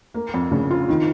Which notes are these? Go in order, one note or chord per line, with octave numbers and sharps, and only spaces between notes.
A#3
F2
C#3
F4
D#3